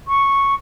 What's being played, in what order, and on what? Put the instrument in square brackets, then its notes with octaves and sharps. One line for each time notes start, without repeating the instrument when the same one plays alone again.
[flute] C#6